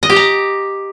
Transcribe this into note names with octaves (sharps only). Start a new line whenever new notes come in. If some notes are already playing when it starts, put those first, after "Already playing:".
D#5
G4
A#5